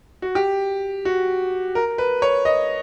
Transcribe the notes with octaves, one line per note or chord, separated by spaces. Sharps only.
F#4
G4
F#4
A#4
B4
C#5
D#5